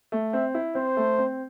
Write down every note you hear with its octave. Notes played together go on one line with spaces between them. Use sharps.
A3
C4 E5
E4
C4 C5
A3
C4